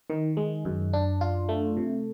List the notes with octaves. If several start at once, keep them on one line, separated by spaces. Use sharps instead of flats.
D#3
G#3
F#2
D4
F4
A3
C3